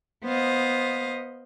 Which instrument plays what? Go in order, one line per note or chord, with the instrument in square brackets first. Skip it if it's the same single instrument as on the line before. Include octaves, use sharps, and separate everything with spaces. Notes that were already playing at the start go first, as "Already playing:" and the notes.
[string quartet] B3 C5 D#5 F5